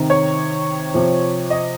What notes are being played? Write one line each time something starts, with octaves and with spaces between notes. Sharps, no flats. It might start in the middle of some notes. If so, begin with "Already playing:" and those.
Already playing: C3 D#3
C#5
C3 F3
D#5